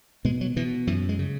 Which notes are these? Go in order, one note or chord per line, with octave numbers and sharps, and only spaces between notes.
B2 G#3
F#3
B2 E3
F#2 E3
G#3
C#3